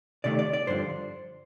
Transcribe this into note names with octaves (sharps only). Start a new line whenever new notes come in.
C3 D#3 A3 D5
D5
D5
G2 D3 F3 C5